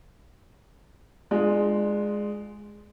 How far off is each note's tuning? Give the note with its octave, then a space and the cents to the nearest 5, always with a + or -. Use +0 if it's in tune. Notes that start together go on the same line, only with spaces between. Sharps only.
G#3 +0 D4 +30 F4 +0